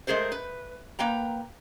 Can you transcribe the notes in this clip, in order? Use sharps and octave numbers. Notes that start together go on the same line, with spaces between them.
G#3 A3 G#4 A#4 C5
B4
A#3 B4 G5 A#5